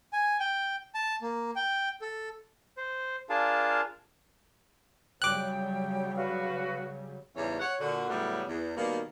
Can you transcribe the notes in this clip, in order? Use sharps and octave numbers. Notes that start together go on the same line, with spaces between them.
G#5
G5
A5
A#3
G5
A4
C5
D4 F4 G#4 A#4 F5 A5
C#3 F#3 G3 G5 D6 F#6
F#4 B4 F5
E2 G#2 C#3 E3 G3 C#4
C#5 F#5
A#2 D3 F#4
A2 C#3 F#3 G3 A3 B3
E2
B2 D#3 G3 A#3